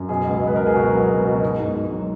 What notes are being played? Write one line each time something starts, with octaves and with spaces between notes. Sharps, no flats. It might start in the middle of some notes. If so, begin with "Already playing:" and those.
Already playing: F#2
B2 G#4
C#2
C#2
B4
C#2 A#4
G#4
B2 F#4
F#3
C#2
B2
G#2
G#2
G#2
F#3